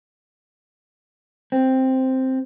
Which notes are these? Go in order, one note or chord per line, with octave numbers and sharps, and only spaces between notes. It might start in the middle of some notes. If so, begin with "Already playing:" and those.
C4